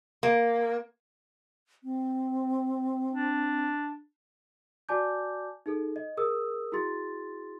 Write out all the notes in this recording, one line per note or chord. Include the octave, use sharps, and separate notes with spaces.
A#3
C4
D4
F#4 D5 G#5 A5 D6 G6
D#4 G#4 A4
D#5
G#4 A#4 D#6 E6
E4 F#4 G#4 C6 A6